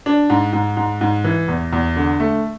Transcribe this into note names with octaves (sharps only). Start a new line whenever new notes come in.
D4
G#2
G#2
G#2
G#2
E3
E2
E2
D3
A3